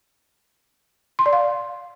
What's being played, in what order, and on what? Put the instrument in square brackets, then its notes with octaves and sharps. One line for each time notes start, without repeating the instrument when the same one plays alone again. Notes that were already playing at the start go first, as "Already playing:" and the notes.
[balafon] C6
D5
F5